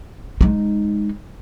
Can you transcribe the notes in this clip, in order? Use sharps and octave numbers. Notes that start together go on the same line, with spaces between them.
G#3 D#4